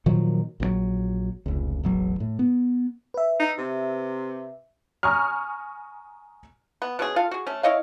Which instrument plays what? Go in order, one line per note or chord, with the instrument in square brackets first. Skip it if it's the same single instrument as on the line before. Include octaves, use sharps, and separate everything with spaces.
[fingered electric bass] A#2 D#3 F3 F#3
A#1 C#3 F#3
F1 C#2
E1 A1 F#3
A2
B3
[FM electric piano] B4 E5
[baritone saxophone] D#4
C3
[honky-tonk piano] G#5 A#5 C#6 D#6 F6
[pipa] B3
B2 C#4 G#4
F4 A4 F5
F#4 G#4
A3 C#4
E4 C#5 D#5 F5